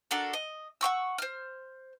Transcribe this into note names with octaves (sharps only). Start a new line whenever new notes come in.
D4 F#4 A4 A#4
D#5
F#5 G5 C#6 E6
C5 F6